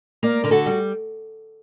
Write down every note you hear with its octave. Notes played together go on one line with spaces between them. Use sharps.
A#3 A#4 D5
D3 A#4
F#4 A4
G3